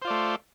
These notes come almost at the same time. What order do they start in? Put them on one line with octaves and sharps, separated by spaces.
C5 F4 D5 A3